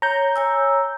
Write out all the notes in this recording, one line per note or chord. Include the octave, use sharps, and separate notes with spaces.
C#5 A#5 G6
C#5 G#5 E6